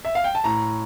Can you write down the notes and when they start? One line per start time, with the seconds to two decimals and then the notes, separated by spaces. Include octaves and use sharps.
0.05 E5
0.15 F5
0.24 G5
0.35 A5
0.44 A2 A#5